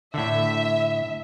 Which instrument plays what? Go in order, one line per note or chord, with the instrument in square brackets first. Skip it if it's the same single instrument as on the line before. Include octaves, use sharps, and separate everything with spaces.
[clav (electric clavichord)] A2 D3 [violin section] E5